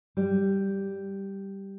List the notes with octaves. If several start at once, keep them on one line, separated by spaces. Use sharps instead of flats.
G3